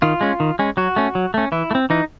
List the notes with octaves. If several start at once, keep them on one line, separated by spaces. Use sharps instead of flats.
D#3 F4
G#3 C#4
D#3
G#3 C#4
F#3 F#4
A3 C#4
F#3
A3 C#4
E3 E4
A3
C4
E3 D#4